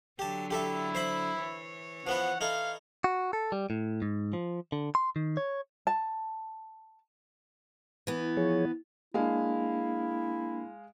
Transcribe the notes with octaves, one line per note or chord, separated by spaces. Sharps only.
D3 F#3 G4 A5
E4 G4 A4 E5
C5 E5 B5
E3 C#5
F3 B3 B4 F#5
D#4 E4 A4 F5
F#4
A4
G3
A2
G#2
F3
D3
C6
D#3
C#5
A5
E3 B3
F3 G#4 C#5
G#3 A#3 D4 E4 F5